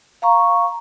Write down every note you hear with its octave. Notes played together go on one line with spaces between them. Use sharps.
F5 A#5 C#6